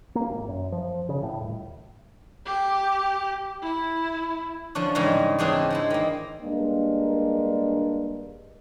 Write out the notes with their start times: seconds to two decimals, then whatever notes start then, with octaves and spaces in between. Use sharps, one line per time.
0.15 A#3
0.29 G#1
0.49 F#2
0.72 F3
1.09 C#3
1.23 A2
1.40 D#1
2.45 G4
3.62 E4
4.75 D3 F3 C#4 D4
4.95 G#2 C#3 E3 G3 G#3
5.39 C#3 E3 C4 D4 D#4 G#4
5.70 G#3 C4 E4
5.90 D#3 A#3
6.41 G2 G#3 A#3 D4